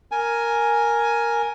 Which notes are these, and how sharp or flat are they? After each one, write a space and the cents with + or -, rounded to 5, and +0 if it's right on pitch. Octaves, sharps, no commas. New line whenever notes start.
A#4 +0 G#5 +5